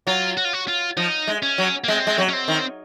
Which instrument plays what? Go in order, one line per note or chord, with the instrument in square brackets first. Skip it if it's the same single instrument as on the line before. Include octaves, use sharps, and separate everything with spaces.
[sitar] F#3 [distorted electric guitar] F4
[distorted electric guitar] F#4
F4
F#4
F4
[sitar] F3 [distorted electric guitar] D#4
[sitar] G#3
[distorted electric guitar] C#4
[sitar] F#3
[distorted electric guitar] A#3
[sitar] G#3 [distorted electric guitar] C4
[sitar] G#3
F#3
[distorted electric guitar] C#4
C4
[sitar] D#3